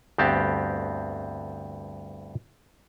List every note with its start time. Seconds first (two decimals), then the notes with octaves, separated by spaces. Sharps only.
0.18 D2 G2 B3 C4 G4 A5